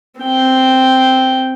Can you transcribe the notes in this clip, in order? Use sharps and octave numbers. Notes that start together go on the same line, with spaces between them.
C4 G5